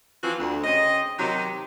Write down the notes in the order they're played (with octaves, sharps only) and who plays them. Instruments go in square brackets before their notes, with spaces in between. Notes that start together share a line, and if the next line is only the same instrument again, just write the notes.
[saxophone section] E3 F3 C4 F4 F#4
D2
C#3 C4 D#5
C3 D#3 F#3 D#4